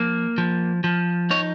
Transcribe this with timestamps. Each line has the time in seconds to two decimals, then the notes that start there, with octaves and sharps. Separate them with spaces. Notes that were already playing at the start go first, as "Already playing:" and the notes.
Already playing: F3 A#3
0.38 F3
0.84 F3
1.30 D#4 C#5